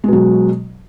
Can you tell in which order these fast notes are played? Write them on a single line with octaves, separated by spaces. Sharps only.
G#3 B2 F#3